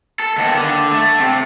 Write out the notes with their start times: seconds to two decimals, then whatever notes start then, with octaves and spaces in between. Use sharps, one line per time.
0.20 A4
0.38 D#2 B3
0.57 D3
0.91 A3
1.20 C3